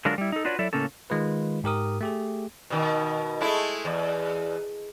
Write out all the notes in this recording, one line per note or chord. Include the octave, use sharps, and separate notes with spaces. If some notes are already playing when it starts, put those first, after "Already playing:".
D3 F#3 G#3 D4 F4 A#4
G3 E4
D#4 A4
D4 F4 F#4 B4 C#5 D5
F#3 E4 A4 D5 E5
A2 C#3 A#3 C#4 A4
D#3 G#3 F4 B4
G#2 G4 A#4 D#6
A3 G4 G#4
B2 D#3
G#3 A3 E4
E2